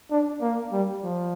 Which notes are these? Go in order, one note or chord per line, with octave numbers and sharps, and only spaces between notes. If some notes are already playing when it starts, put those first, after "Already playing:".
D4
A#3
G3
F3